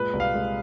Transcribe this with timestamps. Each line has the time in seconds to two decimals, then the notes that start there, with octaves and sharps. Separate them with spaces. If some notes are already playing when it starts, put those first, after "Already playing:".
Already playing: A#2 G#3 B4
0.13 C2
0.20 F5
0.34 G#3